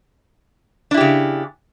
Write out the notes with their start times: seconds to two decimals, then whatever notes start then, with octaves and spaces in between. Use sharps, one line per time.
0.91 D4
0.94 E4
0.97 G4
1.01 C#3